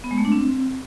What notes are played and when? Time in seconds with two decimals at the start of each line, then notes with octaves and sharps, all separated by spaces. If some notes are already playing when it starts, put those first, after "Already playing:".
0.04 B3
0.11 G#3
0.18 A3
0.25 D4
0.32 C4